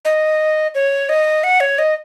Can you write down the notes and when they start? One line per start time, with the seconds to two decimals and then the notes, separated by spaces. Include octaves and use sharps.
0.05 D#5
0.75 C#5
1.09 D#5
1.44 F#5
1.60 C#5
1.79 D#5